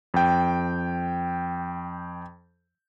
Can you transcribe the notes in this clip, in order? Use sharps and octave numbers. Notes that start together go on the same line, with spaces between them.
F2 G5